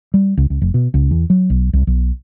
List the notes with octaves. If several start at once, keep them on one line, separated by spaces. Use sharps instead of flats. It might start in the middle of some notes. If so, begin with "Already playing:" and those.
G3
C#2
C#2
F1
B2
C#2
E2
F#3
B1
C2
B1